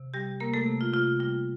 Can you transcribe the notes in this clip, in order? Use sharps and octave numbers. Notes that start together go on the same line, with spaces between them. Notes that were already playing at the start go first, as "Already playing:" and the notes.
Already playing: C3
G3 G4
C3 A#3 A#4
A3 A4
C3
F4
C3 F4
G3 F4